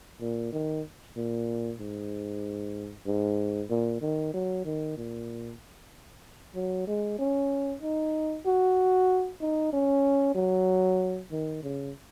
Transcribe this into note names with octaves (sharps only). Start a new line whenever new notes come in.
A#2
D#3
A#2
G#2
G#2
A#2
D#3
F#3
D#3
A#2
F#3
G#3
C#4
D#4
F#4
D#4
C#4
F#3
D#3
C#3